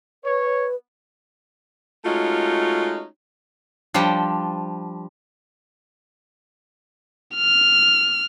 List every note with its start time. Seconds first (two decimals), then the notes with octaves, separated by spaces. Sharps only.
0.24 B4 C#5
2.05 G#3 A3 C#4 D#4 F4 F#4
3.94 F3 G3 D4 C5 G5
7.36 F6